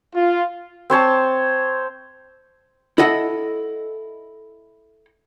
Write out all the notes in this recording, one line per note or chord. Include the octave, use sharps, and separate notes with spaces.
F4
C4 C5 C#5 A5
E4 A4 D#5 F#5